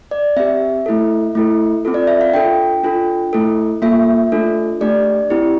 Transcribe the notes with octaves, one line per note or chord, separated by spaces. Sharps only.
D5
C4 G4 E5
A3 E4 A4
A3 E4 A4
C4 F4 A4
D5
E5
F5
D4 F4 A4 G5
D4 F4 A4
A3 E4 A4
A#3 F4 A4 E5
A3 D4 F4 A4
A3 D4 G4 D5
C4 E4 G4